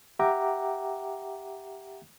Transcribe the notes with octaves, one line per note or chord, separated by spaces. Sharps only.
G4 E5 F#5 G5 A#5 D6